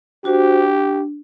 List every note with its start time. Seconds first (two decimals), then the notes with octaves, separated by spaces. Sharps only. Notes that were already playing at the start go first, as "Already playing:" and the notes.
0.24 D4 F#4 G4 C5
0.59 D4